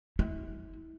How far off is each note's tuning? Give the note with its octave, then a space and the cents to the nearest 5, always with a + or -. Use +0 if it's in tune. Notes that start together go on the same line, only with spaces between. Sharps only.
E4 -35